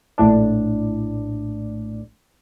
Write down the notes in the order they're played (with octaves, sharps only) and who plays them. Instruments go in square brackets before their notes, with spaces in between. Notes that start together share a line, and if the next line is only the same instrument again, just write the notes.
[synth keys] A#1 A2 D4